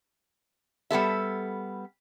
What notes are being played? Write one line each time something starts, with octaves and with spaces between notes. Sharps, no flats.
G3 B3 A4 E5